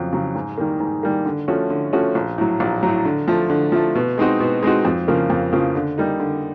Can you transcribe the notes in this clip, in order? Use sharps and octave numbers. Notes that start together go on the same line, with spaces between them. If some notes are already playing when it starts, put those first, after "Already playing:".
Already playing: F2 C#3 F#3
C#3 F#3
G#2
D#3 G3 A#3
G#2
D#3 G3 A#3
D3
F3 A3 C#4 F#4
D3
F3 A3 C#4 F#4
A#1
A2 F#3
A#1
A2 F#3
D3
F3 A3
D3
F3 A3
B2
G#3 C4 D#4 F#4
B2
G#3 C4 D#4 F#4
F2
C#3 F3 A#3
F2
C#3 F3 A#3
D3
G3 A#3 D#4
D3